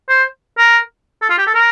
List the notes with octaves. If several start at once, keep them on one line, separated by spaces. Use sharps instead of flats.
C5
A#4
A4
F4
G4
A4
A#4